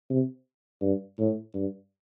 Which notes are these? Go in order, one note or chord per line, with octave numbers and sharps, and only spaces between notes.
C3
G2
A2
G2